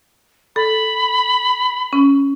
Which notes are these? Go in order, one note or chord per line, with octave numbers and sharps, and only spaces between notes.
A4 B5
C#4